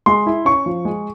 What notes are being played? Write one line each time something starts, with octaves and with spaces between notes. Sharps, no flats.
G#3 C6
E4
C#4 C#6
F3
G#3